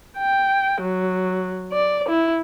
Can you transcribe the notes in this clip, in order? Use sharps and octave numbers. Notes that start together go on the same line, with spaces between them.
G5
F#3
D5
E4